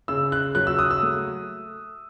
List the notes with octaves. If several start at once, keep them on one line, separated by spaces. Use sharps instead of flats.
C#3 E6
F#6
F#3 F#6
E6
D#6
E6
A3